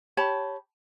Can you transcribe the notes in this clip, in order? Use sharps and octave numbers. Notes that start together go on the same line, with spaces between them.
G4 C#5 A5 B5